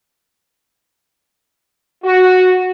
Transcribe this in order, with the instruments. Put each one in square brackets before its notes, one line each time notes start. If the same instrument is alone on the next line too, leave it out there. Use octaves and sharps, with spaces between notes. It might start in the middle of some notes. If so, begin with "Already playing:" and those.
[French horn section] F#4